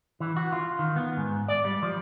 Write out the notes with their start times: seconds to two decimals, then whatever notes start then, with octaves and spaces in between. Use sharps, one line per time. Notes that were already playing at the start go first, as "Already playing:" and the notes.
0.20 E3
0.37 F#4
0.52 F4
0.79 D#3
0.96 B3
1.17 G#2
1.48 D5
1.65 G3
1.83 F3